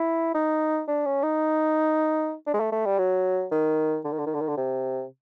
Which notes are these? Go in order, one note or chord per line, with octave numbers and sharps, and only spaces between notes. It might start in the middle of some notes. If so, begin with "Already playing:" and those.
Already playing: E4
D#4
D4
C#4
D#4
D4
G#3
A3
A3
G3
F#3
D#3
D3
D#3
D3
D#3
D3
D#3
D3
C3